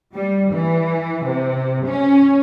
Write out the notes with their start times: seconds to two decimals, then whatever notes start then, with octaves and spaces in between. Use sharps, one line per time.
0.13 G3
0.51 E3
1.26 C3
1.86 C#4